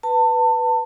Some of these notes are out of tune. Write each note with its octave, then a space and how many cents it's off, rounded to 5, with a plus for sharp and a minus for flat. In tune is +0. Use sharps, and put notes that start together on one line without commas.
B4 +0 A5 +30